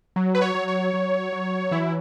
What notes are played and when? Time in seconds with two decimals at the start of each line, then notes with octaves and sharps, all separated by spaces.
0.16 F#3
0.35 B4
0.42 C#5
0.55 F#3
0.68 C#5
0.94 F#3
1.33 F#3
1.71 E3 E4